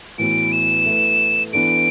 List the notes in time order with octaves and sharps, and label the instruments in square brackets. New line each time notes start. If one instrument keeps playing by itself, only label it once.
[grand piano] A2 E3 B3 F#4 B4 [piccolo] D7
[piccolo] E7
[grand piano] A3 E4 B4
[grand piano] E3 B3 D4 A4 [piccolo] D7